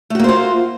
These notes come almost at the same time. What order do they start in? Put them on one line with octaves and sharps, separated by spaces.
A3 F#4 A#3 C5 F4